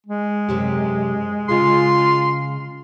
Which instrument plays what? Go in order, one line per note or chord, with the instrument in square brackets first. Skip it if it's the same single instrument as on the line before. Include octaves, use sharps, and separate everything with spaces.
[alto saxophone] G#3
[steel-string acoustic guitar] F#2 C3 G4
[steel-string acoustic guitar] C#3 G#4 [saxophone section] F4 [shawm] C6